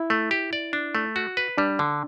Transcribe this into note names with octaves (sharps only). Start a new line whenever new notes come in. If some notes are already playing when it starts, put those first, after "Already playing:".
Already playing: E4
A3
G4
D5
D4
A3
F#4
B4
G3 D4
D3